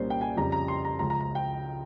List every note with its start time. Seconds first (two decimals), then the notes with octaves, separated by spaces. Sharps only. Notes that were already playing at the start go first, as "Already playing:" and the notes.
Already playing: C2 A#2 G3 A#3 C#4 C5
0.10 G5
0.21 G#5
0.37 F2 C#3 G3 C#4 G4 A#5
0.52 A#5
0.68 C6
0.85 A#5
0.99 C#2 C#3 F3 A#5
1.10 A#5
1.20 A#5
1.35 G5